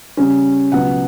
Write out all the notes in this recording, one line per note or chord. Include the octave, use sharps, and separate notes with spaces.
C#3 G3 C#4
C#2 B2 F#3 B3 F#5